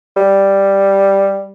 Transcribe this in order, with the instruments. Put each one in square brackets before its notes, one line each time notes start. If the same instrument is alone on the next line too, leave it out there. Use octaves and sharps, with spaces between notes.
[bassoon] G3